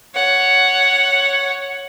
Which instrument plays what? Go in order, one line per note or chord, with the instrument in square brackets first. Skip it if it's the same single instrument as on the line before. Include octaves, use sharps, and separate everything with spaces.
[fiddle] C#5 F#5